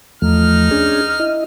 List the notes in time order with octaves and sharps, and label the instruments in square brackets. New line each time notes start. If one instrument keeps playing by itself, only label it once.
[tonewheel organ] E2 F3 A3 [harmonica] D#4 F6
[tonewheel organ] C#4 D4 G#4
E4 D#5